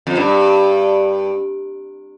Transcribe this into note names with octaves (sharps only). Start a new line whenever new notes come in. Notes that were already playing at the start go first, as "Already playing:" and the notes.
F2
G2